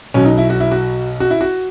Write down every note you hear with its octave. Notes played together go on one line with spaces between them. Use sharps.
B1 B2 F#3 C#4
D#4
E4
F#4
E4
F#4
F#4
E4
F#4